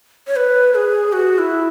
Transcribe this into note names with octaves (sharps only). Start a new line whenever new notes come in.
C#5
B4
G#4
F#4
E4